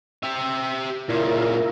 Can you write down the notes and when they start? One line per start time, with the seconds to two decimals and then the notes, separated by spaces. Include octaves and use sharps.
0.23 G4 E5
1.09 A#2 C#3 E4 F4 A#4